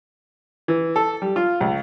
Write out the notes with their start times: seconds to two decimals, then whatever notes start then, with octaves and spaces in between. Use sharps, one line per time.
0.68 E3
0.96 A4
1.22 G3
1.36 F4
1.61 C#2